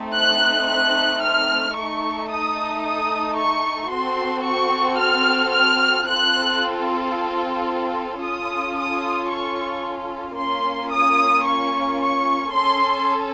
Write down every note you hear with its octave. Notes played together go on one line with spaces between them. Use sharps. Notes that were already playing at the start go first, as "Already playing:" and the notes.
Already playing: A3 C4 D#4
F#6
F#6
F6
A3 D#4 A4 C#6
D#6
D#6
C#6
C4 F#4 A4 C6
C#6
F6
F6
C4 F4 A4 F#6
C#4 F4 A4 D#6
D#6
C#6
A#3 C#4 F4 C6
D#6
C#6
C#6
C#4 A4 C6